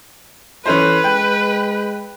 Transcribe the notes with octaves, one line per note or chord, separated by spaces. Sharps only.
E3 C#4 A4 B4 C5
G#3 G5